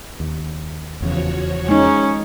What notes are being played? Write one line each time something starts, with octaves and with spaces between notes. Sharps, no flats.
D#2
F1 E2 C#3 F3 F#4 C#5
G#3 C#4 D#4